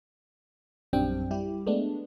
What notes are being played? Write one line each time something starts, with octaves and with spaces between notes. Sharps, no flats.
A#1 F#2 G3 C4 D4 G5
G3 E4 G4
G#3 A3 B3 D4